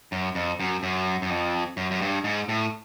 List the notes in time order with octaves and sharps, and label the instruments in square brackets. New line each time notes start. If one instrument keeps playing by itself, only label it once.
[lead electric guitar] F#2
F2
F#2
F#2
F#2
F2
F#2
F#2
G2
G#2
A2